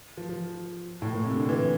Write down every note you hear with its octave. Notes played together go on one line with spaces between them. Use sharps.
F3
F3
A2
A#2
C3
D3
E3